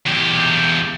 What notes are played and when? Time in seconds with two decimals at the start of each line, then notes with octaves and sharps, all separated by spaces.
0.06 E2 G4